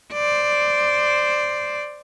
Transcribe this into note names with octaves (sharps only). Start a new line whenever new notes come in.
C5 D5